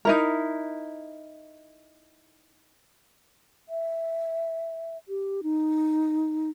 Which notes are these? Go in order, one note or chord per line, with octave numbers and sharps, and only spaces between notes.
D#4 E4 A#4
E5
G4
D#4